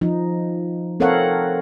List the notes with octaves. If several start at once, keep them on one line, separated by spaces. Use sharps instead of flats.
F3 D#4
C4 A4 A#4 C#5 F5 F#5